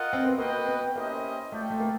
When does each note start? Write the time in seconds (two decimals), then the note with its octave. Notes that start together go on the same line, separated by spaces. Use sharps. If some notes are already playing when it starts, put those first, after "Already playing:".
Already playing: F4 A#4 D#5 F#5
0.13 C4
0.25 B3
0.38 A#3 F#4 B4 D#5 G5
0.67 B3
0.95 A#3 C#4 E4 G4 C5 D#5
1.52 A3 F4 A4 D5 G5
1.70 A3
1.80 A#3